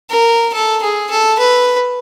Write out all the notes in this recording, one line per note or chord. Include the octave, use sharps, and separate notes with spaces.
A#4
A4
G#4
A4
B4